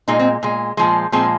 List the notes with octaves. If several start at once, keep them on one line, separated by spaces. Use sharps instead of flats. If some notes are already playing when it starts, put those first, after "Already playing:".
A#2 G#3 D#4
C4
A#2 G#3
A#2 F3 G#3
A#2 F3 G#3 C4